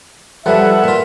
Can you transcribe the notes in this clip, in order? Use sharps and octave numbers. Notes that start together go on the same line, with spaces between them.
F3 G3 A4 B4 E5 F#5
A#2 F4